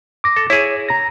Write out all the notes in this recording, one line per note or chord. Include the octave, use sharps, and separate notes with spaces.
D6 A#6
A4
E4 G#4 C#5
A#5 A#6